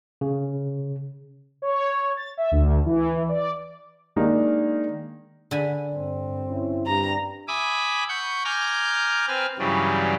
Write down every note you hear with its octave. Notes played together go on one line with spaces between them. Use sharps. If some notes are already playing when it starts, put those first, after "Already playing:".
C#3
C#5
A6
E5
D2
E3
D5
D#3 G#3 A#3 D4 D#4
D3 G#5 B5
G2 C4
C#4 E4
G2 A#5
E5 G#5 B5 D6 D#6
F#5 B5 C#6 G6
G#5 A#5 D6 F6 G6
C4 B4 G#5 F6
G2 C#3 E3 F#3 G3